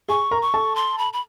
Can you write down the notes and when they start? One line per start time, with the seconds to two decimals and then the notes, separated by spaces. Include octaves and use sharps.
0.08 G#4 G#5 C#6
0.31 A#4 A#5
0.42 C#6
0.54 A4 A5
0.76 C6
0.98 B5
1.13 B5